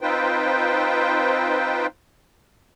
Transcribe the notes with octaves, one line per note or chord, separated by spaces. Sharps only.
C4 D#4 F4 B4 C5 G5